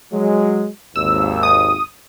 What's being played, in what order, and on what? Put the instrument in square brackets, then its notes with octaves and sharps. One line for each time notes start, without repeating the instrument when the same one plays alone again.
[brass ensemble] F#3 G#3
[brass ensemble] G#1 D#2 [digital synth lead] E6
[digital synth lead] D#6